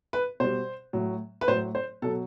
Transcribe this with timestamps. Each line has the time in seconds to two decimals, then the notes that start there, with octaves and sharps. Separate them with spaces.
0.13 B4
0.40 B2 G3 C5
0.93 A2 F#3
1.41 B4
1.48 A2 F#3 C5
1.75 C5
2.02 B2 F#3 A4